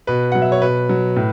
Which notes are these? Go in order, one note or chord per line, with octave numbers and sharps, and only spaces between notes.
B2 B4
F#3 F#5
E5
C#5
B2 B4
F#3
A2